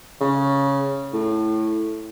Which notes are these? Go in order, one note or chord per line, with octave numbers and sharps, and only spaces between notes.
C#3
A2